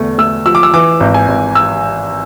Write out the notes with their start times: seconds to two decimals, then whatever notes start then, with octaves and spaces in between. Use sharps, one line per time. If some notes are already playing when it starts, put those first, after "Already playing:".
Already playing: E2 D3 A3
0.18 A3 E6
0.46 F3 E6
0.55 D6
0.63 E6
0.74 E3 D6
1.00 G#1
1.14 G#5
1.28 G#1
1.55 E6